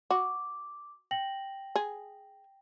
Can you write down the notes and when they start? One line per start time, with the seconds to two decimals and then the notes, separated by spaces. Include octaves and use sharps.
0.11 F#4 D6
1.11 G5 A#6 F#7
1.76 G#4